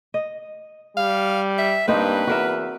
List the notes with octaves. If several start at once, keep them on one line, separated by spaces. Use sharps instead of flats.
D#5
G3 F5
E5
G2 A#3 C4 D#4 B4
E2 F#4 A#4 E5